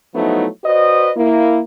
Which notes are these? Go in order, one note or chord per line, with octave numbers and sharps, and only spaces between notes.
F3 F#3 A3 B3 D#4 E4
F#4 B4 C5 D5 D#5
A#3 E4